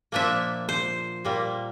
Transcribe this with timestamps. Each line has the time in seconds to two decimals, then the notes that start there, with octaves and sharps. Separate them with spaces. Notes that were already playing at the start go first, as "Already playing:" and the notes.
0.12 A#2 F3 A#3 D4 E5
0.69 C5
1.25 A#2 G3 A#3